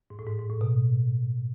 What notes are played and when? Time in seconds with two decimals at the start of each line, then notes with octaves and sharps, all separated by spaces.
0.10 G#2
0.19 A2
0.27 G#2
0.39 G#2
0.50 A2
0.61 B2